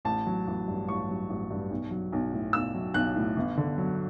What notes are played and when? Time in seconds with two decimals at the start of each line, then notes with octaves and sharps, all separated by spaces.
0.05 A1 A5
0.27 F#3
0.47 A1
0.68 G2
0.87 A1 C#6
1.09 F#3
1.30 A1
1.51 G2
1.70 B1
1.91 F#3
2.12 B1
2.33 A2
2.53 B1 E6
2.75 F#3
2.94 B1 F#6
3.16 A2
3.37 G1
3.57 D3
3.78 F#3